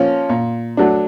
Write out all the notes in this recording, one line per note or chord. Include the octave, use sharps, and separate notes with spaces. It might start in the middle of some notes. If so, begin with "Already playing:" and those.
Already playing: F3 A#3 C#4
A#2
F#3 A3 D4